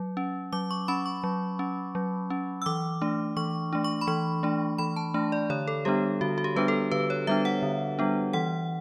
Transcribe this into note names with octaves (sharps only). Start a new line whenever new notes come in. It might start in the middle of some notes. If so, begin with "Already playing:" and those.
Already playing: F#3
C#4
F#3 D6
C#6
C#4 B5
C#6
F#3
C#4
F#3
C#4
E6
E3 D6
A3 D4
E3 C#6
A3 D4
C#6
B5
E3 C#6
A3 D4
E3 B5
A5
A3 D4
D5
D3 C#5
A4
G3 B3 D4 G4
D3 F#4
F#4
G4
G3 B3 D4 B4
A4
D3 B4
C#5
G3 B3 D4 E5
F#5
D3
G3 B3 D4
E3 F#5